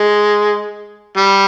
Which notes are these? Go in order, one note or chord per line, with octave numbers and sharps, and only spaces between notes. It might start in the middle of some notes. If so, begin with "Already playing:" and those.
Already playing: G#3
G3